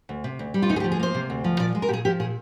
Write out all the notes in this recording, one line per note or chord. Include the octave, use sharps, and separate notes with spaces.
D2
C3
D2
G3
F4
D2 D#4
G#4
G4
F3
G#4
A#3 C5
C3
D2
F3
A#2 D5
G#3
A#4
A#2 G4 G#4
F3 G4
A#2 G#4